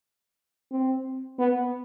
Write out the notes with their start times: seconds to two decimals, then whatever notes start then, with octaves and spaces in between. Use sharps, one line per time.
0.71 C4
1.39 B3